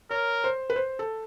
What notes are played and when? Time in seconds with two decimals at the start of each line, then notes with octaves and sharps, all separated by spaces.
0.10 A#4 C#5
0.44 C5
0.70 B4
0.76 C5
0.99 A4